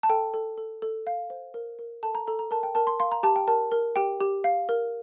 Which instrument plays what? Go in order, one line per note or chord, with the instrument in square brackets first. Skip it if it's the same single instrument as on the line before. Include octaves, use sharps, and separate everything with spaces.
[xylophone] A5
A4 G5
A4
A4
A4
F5
C5
A#4
A#4
A4 A5
A#5
A4 A#5
A#5
A#4 A5
G5
A#4 A5
C6
F5 C6
A#5
G4 A5
G5
A#4 A5
A#4
G4 G5
G4
F5
A#4